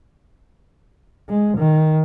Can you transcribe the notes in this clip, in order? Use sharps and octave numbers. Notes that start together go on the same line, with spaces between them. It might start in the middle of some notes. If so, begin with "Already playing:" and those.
G#3
D#3